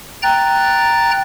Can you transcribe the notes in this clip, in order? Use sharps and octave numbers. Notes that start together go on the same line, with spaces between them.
G5 A#5 F#6 A6